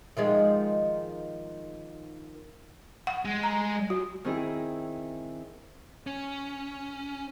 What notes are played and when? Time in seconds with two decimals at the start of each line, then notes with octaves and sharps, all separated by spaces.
0.17 D#3 F3 G#3
3.07 F#5
3.25 G#3
3.43 A#5
3.90 F#4
4.24 D#3 C4 D#4 E4 G#4 D#5
6.07 C#4